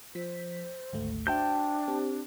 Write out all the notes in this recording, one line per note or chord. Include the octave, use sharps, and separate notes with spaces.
F3 C5 B6
G#1 D2 A3
D4 F#4 C5 E5 G5 A5 G6
C4 G4